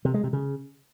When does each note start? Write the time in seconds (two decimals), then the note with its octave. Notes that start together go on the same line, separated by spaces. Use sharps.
0.05 C3
0.14 G#3
0.24 C3
0.33 C#3